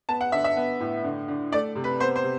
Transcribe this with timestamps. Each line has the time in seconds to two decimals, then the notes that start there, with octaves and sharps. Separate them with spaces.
0.09 B3 A5
0.21 F#5
0.32 D3 E5
0.44 E5
0.57 B3
0.80 A2
1.04 D3
1.28 D3
1.52 A3 D5
1.76 C3
1.84 B4
2.00 B3 C5
2.16 C5
2.24 C3